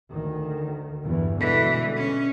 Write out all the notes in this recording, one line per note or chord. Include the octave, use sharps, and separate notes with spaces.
D2 D#3
E2 G2 E3
B2 D3 E3 G#3
C#4